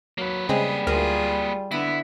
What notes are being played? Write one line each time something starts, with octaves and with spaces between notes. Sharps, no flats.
F#3 A#3 B4
C#3 G3 G#3 C4 G#4
D2 F4 G#4 A#4
D3 B3 E4 A#6